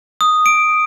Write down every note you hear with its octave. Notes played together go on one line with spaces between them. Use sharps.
D#6
D7